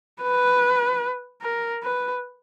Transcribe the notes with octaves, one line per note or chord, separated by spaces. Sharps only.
B4
A#4
B4